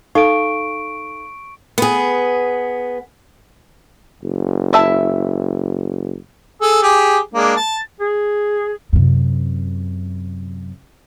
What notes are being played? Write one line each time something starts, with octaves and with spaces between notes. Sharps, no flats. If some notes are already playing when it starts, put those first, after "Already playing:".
D#4 A4 F5 C#6 D7
B3 G#4
F#1
E4 E5 A5
G#4 A4
G4 G#4
G#3 A#3 D4
A5
G#4
F#2 C3